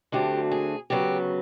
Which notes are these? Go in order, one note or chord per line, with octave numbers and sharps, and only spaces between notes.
D2 D3 F#3 A3 C4 G4
G#4
D2 C#3 F#3 B3 G4